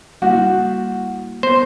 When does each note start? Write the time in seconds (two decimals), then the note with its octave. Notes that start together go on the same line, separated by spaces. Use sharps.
0.22 G3 A#3 E4 F#4
1.43 B3 C5 G6 A#6